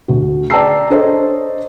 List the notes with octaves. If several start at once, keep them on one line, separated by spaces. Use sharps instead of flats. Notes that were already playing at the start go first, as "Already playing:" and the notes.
D2 F#4
D5 G5 A5 A#5 E6 C7
D4 A4 C5 C#5 D#5